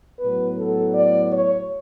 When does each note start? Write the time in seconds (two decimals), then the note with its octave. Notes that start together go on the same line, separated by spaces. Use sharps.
0.19 A2 F#3 B3 B4
0.58 A4
0.95 D5
1.32 C#5